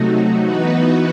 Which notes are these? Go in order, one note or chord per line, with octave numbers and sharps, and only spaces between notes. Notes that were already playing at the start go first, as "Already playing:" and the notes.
Already playing: C3 F#3 A3 D#4 F#4
E3 B3 D#4 F#4 B4